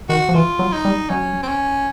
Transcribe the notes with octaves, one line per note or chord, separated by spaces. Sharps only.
D#3 F#4
F3
E3 F4
F#3
D#4
G3
F#3 C#4
C4
C#4